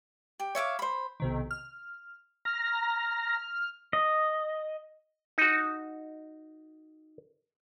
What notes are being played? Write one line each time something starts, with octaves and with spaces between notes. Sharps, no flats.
G4
C#5 E5 F5 D6
C5 B5
B1 C3 D#3
F6
A#5 F6
D#5
D#4 F#4